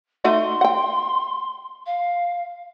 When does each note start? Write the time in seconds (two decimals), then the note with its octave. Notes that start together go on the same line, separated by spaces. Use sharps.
0.24 A3 D#4 F#4 C6
0.61 F#5 G5
1.86 F5